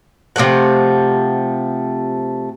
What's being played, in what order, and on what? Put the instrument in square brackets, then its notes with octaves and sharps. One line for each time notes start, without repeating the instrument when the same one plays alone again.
[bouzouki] C3 F3 A3 F#5